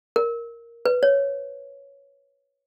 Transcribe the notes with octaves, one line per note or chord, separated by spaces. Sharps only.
A#4
B4
C#5